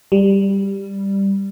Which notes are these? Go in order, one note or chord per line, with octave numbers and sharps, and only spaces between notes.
G3